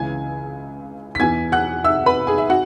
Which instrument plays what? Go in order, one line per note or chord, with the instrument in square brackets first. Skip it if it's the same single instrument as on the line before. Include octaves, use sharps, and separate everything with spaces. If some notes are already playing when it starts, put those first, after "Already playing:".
Already playing: [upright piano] C#2 C#3 E3 G#5 G#6
B6
E2 E3 G#5 G#6
F#5 F#6
E5 E6
B4 B5
G#4 G#5
E5
F#4 F#5